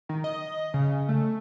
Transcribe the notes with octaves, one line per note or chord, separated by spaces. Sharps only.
D#3
D#5
C#3
A3